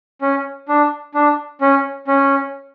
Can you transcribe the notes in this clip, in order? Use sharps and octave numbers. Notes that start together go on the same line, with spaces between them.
C#4
D4
D4
C#4
C#4